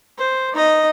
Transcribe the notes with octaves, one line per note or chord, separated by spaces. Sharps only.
C5
D#4 D#5